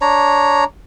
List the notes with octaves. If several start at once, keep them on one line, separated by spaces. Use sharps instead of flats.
D4 C#5 A#5